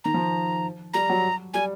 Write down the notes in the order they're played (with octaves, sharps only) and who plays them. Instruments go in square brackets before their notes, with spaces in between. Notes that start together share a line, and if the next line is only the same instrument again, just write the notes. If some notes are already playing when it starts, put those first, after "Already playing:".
[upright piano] D#3 [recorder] A#5
[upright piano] F3
[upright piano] G3 [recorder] A#5
[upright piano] F#3
[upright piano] G3 [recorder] G#5